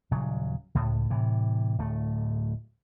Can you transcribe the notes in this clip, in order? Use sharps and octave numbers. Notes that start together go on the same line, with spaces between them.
D#1 C#3 F#3
C#2 A2
A2 C3 E3
D1 A3